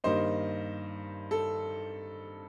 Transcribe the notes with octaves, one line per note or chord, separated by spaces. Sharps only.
G2 D#3 A#3 D#4 C5 D#5
A4